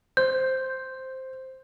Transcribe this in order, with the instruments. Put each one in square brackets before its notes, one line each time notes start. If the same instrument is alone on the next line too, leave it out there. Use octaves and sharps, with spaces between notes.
[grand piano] C5 [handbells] G6